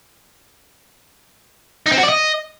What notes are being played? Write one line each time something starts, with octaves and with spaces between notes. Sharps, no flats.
D#4
C4
F#4
D5
D#5